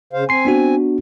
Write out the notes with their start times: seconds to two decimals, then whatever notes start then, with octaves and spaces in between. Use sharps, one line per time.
0.13 C#3 C5 F5
0.29 C4 G#5 C6 C7
0.45 B3 D4 F#4